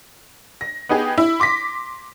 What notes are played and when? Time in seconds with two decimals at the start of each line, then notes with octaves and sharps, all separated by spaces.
0.61 A#6
0.89 B3 D#4 G4 G#4
1.18 E4
1.40 C6 D6 A#6 B6